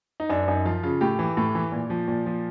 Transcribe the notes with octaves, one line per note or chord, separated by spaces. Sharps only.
D#4
F#2 D4
D4
F#2 D#4
F3 F4
C#3 F4
A2 G4
E3
A2
E3
A#2
F3
A#2
F3